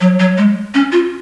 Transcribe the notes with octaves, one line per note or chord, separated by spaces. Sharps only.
F#3
F#3
G#3
C#4
F4